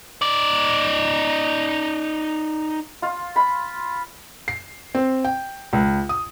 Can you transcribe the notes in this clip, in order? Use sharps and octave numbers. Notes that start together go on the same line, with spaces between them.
D#4 D5
F4
B5
C7
C4
G5
C#2
D#6